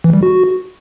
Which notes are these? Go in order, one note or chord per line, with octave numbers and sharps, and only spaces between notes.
E3
G3
F#4